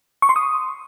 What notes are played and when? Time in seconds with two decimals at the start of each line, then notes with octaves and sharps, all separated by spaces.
0.22 C#6
0.29 C6
0.36 D#6